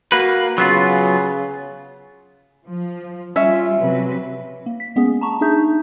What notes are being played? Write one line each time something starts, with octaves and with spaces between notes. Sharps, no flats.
A#3 F#4 B4
C#3 F#3 B3 F4
F3
G3 C#4 F4 E5
C3 F#3 B4
A#3
B6
G#3 B3 C#4 G#4
A5 A#5 C#6
D4 D#4 G#4 E5 G6